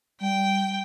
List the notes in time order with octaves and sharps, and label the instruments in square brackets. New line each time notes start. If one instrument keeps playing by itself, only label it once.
[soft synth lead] G3 [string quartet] G5